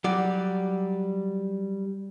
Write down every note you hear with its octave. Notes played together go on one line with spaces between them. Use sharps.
F#3 G3 D5